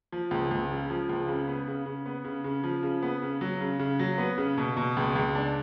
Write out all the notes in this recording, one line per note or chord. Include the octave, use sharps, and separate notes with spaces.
F3
C#2
C#2
C#3
F3
C#2
C#3
B3
C#3
C#3
B3
C#3
C#3
F3
C#3
B3
C#3
F#3
C#3
C#3
F#3
B3
C#3
B2
B2
C#2
C#2
D4